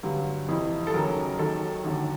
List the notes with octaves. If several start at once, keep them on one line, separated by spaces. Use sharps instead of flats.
G2 D3 F#3
F2 C3 E3
A4
D#2 C#3 F#3 A#4
D#2 D#3 F#3 A4
D#2 D3 F#3